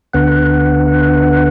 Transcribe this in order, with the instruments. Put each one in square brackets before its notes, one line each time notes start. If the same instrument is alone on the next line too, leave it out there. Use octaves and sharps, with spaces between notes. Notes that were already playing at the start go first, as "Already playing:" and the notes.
[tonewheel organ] D2 D3 B3 F#5